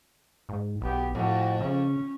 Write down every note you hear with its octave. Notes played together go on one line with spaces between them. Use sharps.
G#2
B1 B3 G4
F2 A2 F#4
C#3 C#4